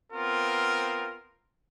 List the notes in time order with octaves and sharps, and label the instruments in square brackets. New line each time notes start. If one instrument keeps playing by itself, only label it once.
[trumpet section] B3 C4 F4 A#4